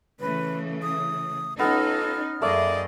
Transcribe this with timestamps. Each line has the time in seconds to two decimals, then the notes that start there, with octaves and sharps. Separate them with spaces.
0.20 C#3 E3 A3 B4
0.82 D#6
1.59 B3 C#4 D#4 F4 A4 F6
2.42 F#2 A3 A#3 G#4 D5 D#5